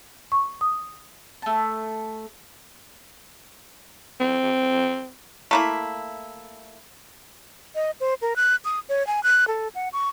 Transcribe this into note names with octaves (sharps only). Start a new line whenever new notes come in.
C#6
D#6
A3 A5
C4
A3 A#3 E4
D#5
C5
A#4
F#6
D#6
C#5
G#5
F#6
A4
F#5
C#6